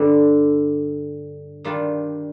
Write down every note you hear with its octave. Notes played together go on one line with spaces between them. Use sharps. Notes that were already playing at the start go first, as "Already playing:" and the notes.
Already playing: G2 D3 G3
D#3 G3 D4 F4